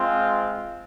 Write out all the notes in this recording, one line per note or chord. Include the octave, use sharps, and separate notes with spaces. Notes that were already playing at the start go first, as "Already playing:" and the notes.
Already playing: G#3 C4 F4